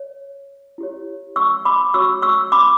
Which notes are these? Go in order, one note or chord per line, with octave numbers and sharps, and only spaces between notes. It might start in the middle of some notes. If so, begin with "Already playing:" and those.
Already playing: C#5
E4 G4 C#5
C#6 E6
B5 D6
F#4 C#5 C#6 E6
C#6 E6
B5 D6